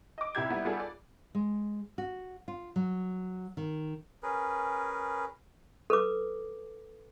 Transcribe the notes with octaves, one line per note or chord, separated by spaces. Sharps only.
D#5 D6
C2 C3 E4 G4 G6 G#6
G3 B3 E4
G3 B3 F4 G#4 A4 D5
D5
G#3
F#4
F4
F#3
D#3
C#4 G#4 A#4 B4
A4 B4 D6